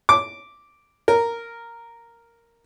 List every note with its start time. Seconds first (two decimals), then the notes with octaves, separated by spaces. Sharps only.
0.09 D6
1.08 A#4